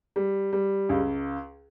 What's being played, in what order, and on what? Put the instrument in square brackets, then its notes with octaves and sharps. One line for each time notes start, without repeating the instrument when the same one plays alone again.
[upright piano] G3
G3
C#2